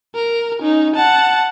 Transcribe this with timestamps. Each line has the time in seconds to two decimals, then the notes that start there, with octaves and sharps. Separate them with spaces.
0.15 A#4
0.60 C#4 D#4
0.95 F#5 A5